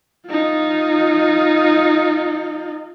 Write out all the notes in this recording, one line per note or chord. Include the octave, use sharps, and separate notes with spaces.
D#4 F4